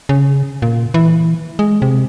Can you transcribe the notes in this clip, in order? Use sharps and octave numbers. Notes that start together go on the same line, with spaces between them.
C#3
A#2
E3
G#3
C3